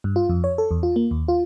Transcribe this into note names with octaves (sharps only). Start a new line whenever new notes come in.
G2
F4
F2
C#5
A4
E2
F4
A#3
D#2
F4